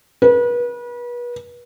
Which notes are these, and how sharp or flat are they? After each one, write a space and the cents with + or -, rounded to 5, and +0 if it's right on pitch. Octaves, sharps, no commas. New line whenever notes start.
B4 -35